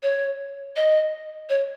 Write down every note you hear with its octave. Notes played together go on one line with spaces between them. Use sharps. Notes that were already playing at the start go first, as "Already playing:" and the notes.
C#5
D#5
C#5